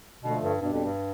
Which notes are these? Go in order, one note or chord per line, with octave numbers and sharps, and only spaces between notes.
B2 D3 F3 A3
G2
G2 B2 G3 D4
F2
G2